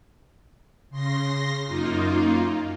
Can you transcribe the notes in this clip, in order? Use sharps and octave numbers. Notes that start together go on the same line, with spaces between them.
C#3 C6 A#6
F#2 A#3 D#4 F4